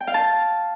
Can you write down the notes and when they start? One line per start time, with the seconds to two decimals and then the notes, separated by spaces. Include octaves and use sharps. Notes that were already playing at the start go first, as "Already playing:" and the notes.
0.01 G5
0.07 F5
0.14 A5